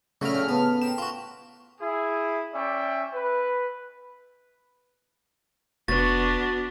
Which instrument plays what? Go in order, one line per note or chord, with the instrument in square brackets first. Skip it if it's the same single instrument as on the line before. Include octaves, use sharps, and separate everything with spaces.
[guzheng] A#2 [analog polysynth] C#3 F6 [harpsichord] F#3 A3
[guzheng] A2 A#4
[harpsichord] B3 [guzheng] A4
[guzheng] G4 A#4 C5 [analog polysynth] E7
[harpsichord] F4 F#4
[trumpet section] E4 G#4
C#4 D5 E5 G5
B4
[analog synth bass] F1 [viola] B3 D4 [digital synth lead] F#4 [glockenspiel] A6